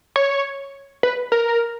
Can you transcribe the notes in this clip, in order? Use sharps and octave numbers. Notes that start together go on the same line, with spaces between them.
C#5
B4
A#4